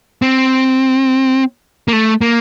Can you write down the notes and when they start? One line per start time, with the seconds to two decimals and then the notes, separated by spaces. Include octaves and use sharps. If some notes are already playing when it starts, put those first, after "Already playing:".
0.22 C4
1.88 A#3
1.93 A3
2.21 A#3